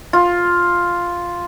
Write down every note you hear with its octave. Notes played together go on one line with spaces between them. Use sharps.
F4